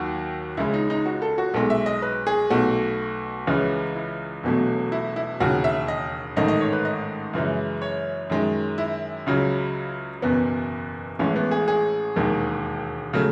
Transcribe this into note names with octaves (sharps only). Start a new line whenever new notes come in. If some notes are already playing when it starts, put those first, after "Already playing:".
Already playing: D#2 D#3 F#3 F#4
C#2 C#3 G#3 E4
D#4
D#4
F#4
A4
F#4
B1 B2 G#3 A4
E5
D#5
B4
G#4
B1 B2 A3 F#4
C#2 C#3 E3 G#3
E4
E1 E2 B2 F#3 A3
E4
E4
E1 D#2 C#3 F#4
E5
D#5
A1 G#2 D#3 A3 D#5
D#5
C#5
B4
D#5
F#2 C#3 E3 G#3
C#5
F#2 D#3 G#3
E4
C#2 C#3 F#3
F#1 E2 B2 B3
A1 A2 E3 G#3 C#4
B3
G#4
G#4
E1 D#2 D#3 G#3
C#3 F#3 A3